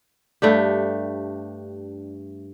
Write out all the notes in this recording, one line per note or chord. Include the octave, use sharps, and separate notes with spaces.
G2 A3 D4 G4